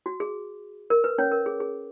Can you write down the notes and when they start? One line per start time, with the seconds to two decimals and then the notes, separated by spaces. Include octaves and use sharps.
0.06 F#4
0.20 G#4
0.90 A#4
1.04 B4
1.18 C#4 C#5
1.32 A#4
1.46 G#4
1.60 G#4